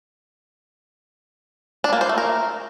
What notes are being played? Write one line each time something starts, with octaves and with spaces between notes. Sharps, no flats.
D4
A#3
C5
A3
A#4